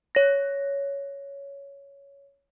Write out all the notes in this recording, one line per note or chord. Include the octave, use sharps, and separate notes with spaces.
C#5 A#6